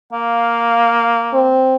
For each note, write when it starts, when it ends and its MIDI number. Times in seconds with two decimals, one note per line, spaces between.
0.13 1.61 58
0.13 1.50 77
1.33 1.76 60